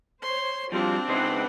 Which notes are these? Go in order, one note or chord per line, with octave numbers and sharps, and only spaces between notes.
C5 C#5 C6
F3 G3 C4 D4 F#4 F5
C#2 D#4 B4 C5 F#5 G5